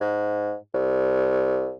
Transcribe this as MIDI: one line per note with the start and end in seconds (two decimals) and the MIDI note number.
0.01 0.55 44
0.74 1.75 36